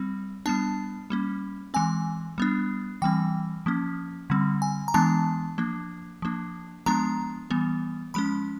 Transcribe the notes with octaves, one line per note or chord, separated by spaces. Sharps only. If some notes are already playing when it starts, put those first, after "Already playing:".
Already playing: G3 C4
G3 B3 D4 A5
G3 A#3 C#4
E3 G#3 C4 G#5
G3 B3 D4
E3 G3 C4 G5
F3 A#3 C#4
D3 G3 C4
G#5
A#5
E3 G#3 B3 D4 A5
F3 A#3 D4
F3 A#3 D4
F3 G#3 B3 D4 A#5
E3 G3 B3
F3 G#3 C#4 B5